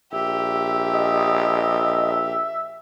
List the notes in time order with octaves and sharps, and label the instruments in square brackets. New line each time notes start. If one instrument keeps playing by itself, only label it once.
[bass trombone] A#1 [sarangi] G4 [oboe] E5
[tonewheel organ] D#5